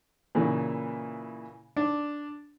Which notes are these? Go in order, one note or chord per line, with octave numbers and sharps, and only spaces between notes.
A#2 C#3 E3
D4